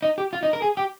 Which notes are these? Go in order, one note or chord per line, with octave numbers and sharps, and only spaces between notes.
D#4
G4
F4
D#4
A#4
G#4
G4